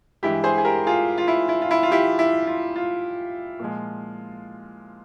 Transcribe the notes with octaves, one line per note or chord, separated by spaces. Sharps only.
G2 E3 G#3 E4 G4
G#4 C5
G#4
G4 A#4
F4 G#4
F4
E4
E4
F4
E4
F4
E4 G4
E4
F4
F4
A#2 F3 G#3